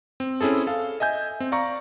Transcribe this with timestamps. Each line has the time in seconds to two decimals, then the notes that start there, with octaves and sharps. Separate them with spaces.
0.20 C4
0.41 C4 C#4 E4 G#4 A4
0.67 A4 F5
1.00 D#5 E5 G#5 G6
1.40 C4
1.52 D5 F5 A#5 C#6